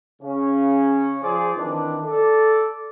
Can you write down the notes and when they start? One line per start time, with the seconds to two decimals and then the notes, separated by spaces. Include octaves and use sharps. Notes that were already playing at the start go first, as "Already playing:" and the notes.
0.22 C#3 C#4
1.23 F3 G#4 C5 D5
1.56 D#3 E3 C4 D4
2.04 A4 D5